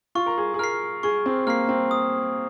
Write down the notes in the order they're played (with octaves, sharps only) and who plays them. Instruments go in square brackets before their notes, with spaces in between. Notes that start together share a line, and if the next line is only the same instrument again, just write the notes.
[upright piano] F4 [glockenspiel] C#6
[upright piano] A#4
G#4
G#4
[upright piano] A#4 [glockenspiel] F6 C7
[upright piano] G#4 [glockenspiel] C#6
[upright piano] C4
[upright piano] A#3 [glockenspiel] F6 C7
[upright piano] C4
[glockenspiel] D#6